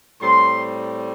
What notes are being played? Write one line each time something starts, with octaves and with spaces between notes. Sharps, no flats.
A2 G3 C4 C6